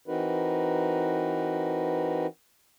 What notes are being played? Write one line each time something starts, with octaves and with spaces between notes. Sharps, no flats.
E3 C4 D#4 F#4 A#4 B4